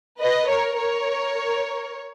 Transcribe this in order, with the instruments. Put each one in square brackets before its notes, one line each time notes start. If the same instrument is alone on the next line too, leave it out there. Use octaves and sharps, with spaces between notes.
[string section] B4 D#5
A#4 C#5
A#4 C#5